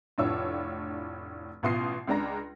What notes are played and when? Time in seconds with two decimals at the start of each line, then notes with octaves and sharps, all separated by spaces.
0.18 F1 A2 D4 F4 C#5 E6
1.63 A1 B2 F4 C6 D#6 C7
2.07 C#2 G#3 D4 A#5 A#6